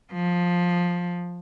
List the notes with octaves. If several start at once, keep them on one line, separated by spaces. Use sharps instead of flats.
F3